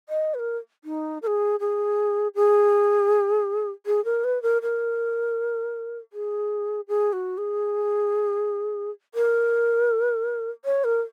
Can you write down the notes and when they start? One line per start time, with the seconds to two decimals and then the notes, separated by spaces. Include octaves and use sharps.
0.09 D#5
0.34 B4
0.39 A#4
0.84 D#4
1.22 A#4
1.27 G#4
1.60 G#4
2.35 G#4
3.86 G#4
4.05 A#4
4.24 B4
4.43 A#4
4.62 A#4
6.13 G#4
6.88 G#4
7.13 F#4
7.38 G#4
9.14 A#4
10.65 C#5
10.84 A#4